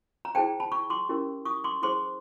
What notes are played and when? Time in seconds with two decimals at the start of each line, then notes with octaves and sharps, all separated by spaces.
0.25 A#5
0.35 E4 G#4 C5 G5 A5
0.60 A5 B5
0.72 B5 C#6
0.90 C6 D6
1.09 C#4 E4 G4 A#4
1.45 C#6 D#6
1.64 C6 D6
1.82 E4 G#4 C5 C6 D6